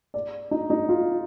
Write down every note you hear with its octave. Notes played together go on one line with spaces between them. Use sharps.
D5
D#4
D#4
F4